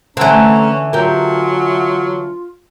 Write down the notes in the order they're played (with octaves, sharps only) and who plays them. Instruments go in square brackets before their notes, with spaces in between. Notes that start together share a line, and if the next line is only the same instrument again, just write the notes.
[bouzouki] D3 E3 [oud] A3 C4 [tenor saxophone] C#4 [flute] A#5
[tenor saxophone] F#3 [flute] F4 [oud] G4 A#4